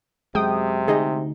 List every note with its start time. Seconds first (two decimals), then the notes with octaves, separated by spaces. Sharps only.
0.35 F#2 C3 G#3 G5 D#6
0.88 D2 D#4 G#4 D#5